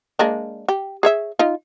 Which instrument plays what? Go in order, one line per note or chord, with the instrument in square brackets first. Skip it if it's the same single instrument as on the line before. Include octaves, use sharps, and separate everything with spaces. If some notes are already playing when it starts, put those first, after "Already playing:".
[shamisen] G#3 A#3 D4
G4
G#4 C#5 E5
D#4 F4